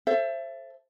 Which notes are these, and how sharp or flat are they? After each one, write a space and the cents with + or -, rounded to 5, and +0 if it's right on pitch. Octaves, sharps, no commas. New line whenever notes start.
A4 +0 C5 +20 E5 +30